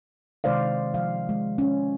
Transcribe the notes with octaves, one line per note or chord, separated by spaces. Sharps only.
C3 D#3 G#3 C5 D5 F5
F3 F5
G#3
C#4